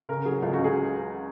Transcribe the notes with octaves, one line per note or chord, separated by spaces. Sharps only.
C#3 A#4
F#3 G#4
C#2 F4
F#4
C#2
G#4